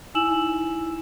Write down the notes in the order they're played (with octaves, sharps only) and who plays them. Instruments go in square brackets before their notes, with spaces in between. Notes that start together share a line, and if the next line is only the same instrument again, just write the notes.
[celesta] D#4 E4 G#5 E6 E7 F#7